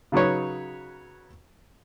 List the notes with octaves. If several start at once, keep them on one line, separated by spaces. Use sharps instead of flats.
C#3 F#3 D#4 B4 C#5